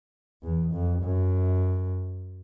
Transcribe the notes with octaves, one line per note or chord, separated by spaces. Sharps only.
E2
F2
F#2